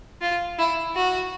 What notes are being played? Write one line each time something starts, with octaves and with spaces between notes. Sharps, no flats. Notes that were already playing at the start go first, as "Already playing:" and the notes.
F4
E4
F#4